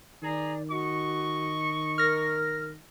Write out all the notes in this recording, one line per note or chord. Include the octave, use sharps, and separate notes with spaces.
D#3 G#4 D5 A#5
F#4 D#5 C#6
A#4 F6 A#6